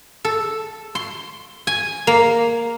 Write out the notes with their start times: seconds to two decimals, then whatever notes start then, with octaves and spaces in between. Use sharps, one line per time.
0.24 A4
0.95 C6
1.67 G#5
2.07 A#3